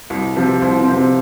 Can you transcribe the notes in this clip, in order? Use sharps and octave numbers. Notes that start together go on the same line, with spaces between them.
C2
C3 F3
C2 C5
C4
C3 F3
C4